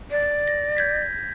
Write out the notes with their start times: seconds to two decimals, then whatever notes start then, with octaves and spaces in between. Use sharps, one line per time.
0.11 D5
0.48 A#6
0.77 G6 G#6 B6